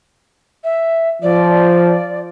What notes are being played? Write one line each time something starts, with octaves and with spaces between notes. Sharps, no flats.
E5
F3 D5